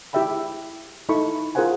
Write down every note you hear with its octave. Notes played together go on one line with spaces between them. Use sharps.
E4 G4 G#4 E5 G5 B5
D#4 E4 A4 B5 C#6
F4 G#4 A#4 C5 F#5 G#5